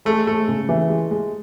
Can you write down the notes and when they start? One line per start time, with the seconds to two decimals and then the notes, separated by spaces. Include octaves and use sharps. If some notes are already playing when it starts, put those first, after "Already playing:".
0.05 G#3 A3
0.27 G#3 A3
0.48 C#3
0.69 E3
0.89 G#3
1.11 G#3